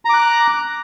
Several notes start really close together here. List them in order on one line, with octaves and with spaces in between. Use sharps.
A#5 D6 F#6